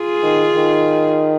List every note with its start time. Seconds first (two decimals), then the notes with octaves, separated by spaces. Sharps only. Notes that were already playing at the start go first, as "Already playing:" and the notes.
Already playing: F4 G#4
0.23 D#3
0.55 D#3